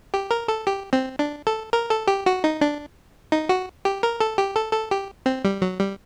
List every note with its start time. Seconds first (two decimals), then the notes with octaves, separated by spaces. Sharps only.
0.14 G4
0.31 A#4
0.48 A4
0.67 G4
0.93 C4
1.19 D4
1.47 A4
1.73 A#4
1.90 A4
2.07 G4
2.26 F#4
2.44 D#4
2.61 D4
3.32 D#4
3.49 F#4
3.85 G4
4.03 A#4
4.20 A4
4.38 G4
4.56 A4
4.73 A4
4.91 G4
5.26 C4
5.45 G3
5.62 F#3
5.79 G3